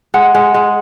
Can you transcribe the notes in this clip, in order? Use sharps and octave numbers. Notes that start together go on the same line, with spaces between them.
G#3 F#5
G#3
G#3